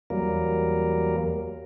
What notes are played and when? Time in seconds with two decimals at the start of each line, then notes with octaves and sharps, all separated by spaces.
0.10 E2 F#3 G3 A#3 A#4